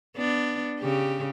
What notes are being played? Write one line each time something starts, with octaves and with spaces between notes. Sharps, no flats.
B3 D4
C#3 G4